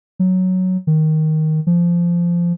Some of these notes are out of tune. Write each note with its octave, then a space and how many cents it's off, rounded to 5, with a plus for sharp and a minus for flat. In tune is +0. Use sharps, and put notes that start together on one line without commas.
F#3 +0
D#3 +5
F3 -15